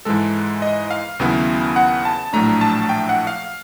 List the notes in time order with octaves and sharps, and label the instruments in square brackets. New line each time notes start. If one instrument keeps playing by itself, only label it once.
[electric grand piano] G#2 E3 G#3 A4
D#5
F5
D#2 C#3 F#3 B3 E4
F#5
A5
A#1 A2 F#3 A3 D4 A#5
A5
G5
F#5
F5